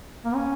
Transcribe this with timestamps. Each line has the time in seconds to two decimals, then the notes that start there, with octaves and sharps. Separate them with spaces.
0.25 A#3
0.35 C#4